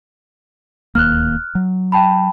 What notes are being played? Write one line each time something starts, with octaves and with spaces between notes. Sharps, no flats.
D1 D#2 A#3 F6 F#6
F#3
G5 A5 B5